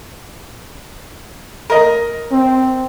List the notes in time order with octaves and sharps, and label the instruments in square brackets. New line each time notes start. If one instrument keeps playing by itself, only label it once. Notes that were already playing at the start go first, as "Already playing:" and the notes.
[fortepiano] A#4 D#5
[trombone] C4